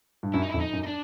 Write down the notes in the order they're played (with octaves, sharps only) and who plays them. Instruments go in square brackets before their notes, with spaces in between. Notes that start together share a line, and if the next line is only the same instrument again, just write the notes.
[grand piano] G2
[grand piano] F#2 [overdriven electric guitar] E4
[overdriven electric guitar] D#4
E4
[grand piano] F2
[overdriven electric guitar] D#4
[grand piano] F#2
[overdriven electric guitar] D#4
D4